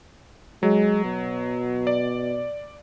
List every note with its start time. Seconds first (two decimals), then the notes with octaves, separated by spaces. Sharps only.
0.63 F#3 G#3
1.04 B2
1.87 D5